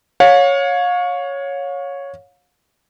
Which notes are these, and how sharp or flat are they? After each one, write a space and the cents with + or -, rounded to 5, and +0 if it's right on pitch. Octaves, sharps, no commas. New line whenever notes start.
C#5 +0 F5 +35